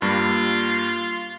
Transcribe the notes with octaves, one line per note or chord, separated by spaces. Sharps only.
G2 G3 A#3 F4